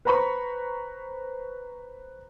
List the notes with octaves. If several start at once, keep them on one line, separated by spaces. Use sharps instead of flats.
B4 C5 A#5 B5 C#6